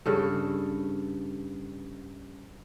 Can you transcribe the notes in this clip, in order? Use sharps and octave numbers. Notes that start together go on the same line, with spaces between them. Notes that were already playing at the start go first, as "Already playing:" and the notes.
G2 C#3 A4